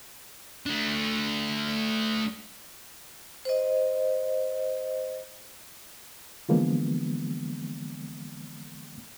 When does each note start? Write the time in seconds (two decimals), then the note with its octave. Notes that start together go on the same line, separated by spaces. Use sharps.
0.66 A3 D4
3.45 C5 D#5
6.49 D3 E3 F3 G#3 A#3 B3